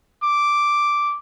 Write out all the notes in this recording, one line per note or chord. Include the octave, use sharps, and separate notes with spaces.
D6